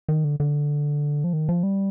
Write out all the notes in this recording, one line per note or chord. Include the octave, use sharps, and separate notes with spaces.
D#3
D3
D3
F3
D#3
F3
G3